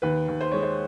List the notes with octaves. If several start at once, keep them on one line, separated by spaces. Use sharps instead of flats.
D#2 B4
D#2
C5
G#3 C#5
C5